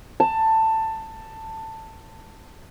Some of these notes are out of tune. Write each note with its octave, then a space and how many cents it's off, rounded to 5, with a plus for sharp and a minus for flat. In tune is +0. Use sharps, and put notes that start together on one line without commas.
A5 +15